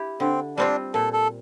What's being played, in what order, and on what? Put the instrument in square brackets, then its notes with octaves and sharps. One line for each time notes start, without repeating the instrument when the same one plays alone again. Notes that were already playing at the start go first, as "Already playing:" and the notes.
Already playing: [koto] E4 G4
[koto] D3 [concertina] C4
[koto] G3 C4 F4 [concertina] D4
[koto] A#2 [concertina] A4
[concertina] A4